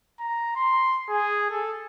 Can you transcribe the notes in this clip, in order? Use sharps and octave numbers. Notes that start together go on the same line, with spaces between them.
A#5
C6
G#4
A4